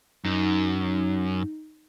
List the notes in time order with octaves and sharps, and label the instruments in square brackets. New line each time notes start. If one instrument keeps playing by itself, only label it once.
[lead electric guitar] F#2 [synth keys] D#4